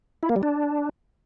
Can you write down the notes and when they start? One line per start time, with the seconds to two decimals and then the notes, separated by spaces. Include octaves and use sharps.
0.23 E4
0.29 A#3
0.36 G3
0.43 D4